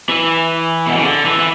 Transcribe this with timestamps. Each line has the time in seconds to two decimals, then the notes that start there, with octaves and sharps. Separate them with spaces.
0.09 E3
0.87 B2
0.95 C#3
1.01 D3
1.25 E3
1.39 E3